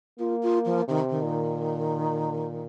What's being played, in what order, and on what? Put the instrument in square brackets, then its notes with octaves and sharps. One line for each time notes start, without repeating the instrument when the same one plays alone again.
[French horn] A#3 [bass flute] F4
[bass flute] F4
F3
[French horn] C3 [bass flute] D#3
[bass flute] D#3
[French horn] A#2